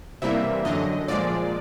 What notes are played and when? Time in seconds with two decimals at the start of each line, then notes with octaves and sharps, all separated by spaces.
0.22 C3 E3 G3 A#3 E5
0.65 F#2 D3 F#3 D#5
1.08 A#2 F3 G#3 D5